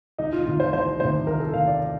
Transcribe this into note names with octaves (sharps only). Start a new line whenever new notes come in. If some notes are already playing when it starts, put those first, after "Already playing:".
C2 D#4
F4
C3 D#3 F4
C5
C2 C5
C3 D#3 C5
C2 A#4
A4
C3 D#3 F5
D5
D5